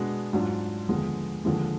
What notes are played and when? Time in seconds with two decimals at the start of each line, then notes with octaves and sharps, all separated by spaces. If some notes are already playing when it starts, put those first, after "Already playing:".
Already playing: B2 G#3 B3 D4
0.33 G#2 F#3 D4 F4
0.89 D#2 D3 F3 G#3 B3
1.45 D#2 D3 F3 G#3